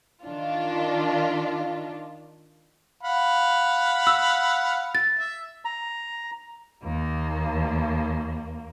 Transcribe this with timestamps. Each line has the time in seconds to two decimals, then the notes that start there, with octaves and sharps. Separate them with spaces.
0.25 D#3 D4 F4
3.03 F5 F#5 B5
4.07 E6
4.95 A6
5.19 E5
5.65 A#5
6.84 D#2 A#3